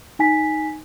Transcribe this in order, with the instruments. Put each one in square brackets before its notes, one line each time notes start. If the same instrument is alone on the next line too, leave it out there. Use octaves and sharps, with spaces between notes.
[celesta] D#4 G#5 B6